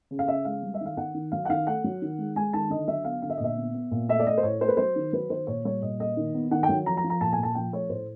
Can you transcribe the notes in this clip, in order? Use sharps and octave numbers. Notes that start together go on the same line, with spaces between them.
C#3
F5
C#3 E5
G#3 F5
G3
E5
D#3 F5
D#3 F#5
D#3
F#3 F5
F#5
D#3 F5
A3 F#5
F#3
D#3
G#3
G#3 G#5
D#3 A5
D3 D#5
F#3 E5
B3 F5
D3 F5
E5
D#5
A#2 E5
B3
B3
A#2
A3 E5
D5
A3 D#5
C5
A2 C#5
A3 C5
B4
F#3 C5
D#3
F#3 B4
D#3 C5
A#2 C#5
G3 C#5
A#2 D#5
A#3 D#5
D#3
B3
D#3 F#5
G5
F#3
F3 A#5
A#5
F3
A#5
A#2 A5
G#5
A#2
A5
F3 G5
A3 C#5
A2 C5